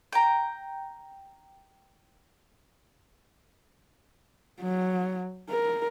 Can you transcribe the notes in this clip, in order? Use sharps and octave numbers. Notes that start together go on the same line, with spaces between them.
G5 A#5
F#3
A#4